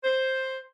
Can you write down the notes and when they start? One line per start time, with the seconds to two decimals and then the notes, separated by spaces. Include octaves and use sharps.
0.04 C5